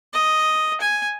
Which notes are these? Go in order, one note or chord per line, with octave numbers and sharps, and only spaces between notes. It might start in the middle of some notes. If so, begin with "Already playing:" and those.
D#5
G#5